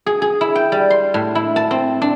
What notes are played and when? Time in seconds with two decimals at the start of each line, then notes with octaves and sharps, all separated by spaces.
0.06 G#4
0.22 G#4
0.41 E4
0.55 G5
0.72 G3
0.90 C6
1.14 A2
1.35 E4
1.56 A5
1.71 C4
2.02 D4